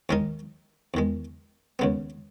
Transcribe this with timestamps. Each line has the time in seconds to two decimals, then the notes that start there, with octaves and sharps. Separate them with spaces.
0.09 D#2 D#3 G#3 D#4 A#4
0.94 E2 D#3 G#3
1.79 D#2 C#3 G#3 B3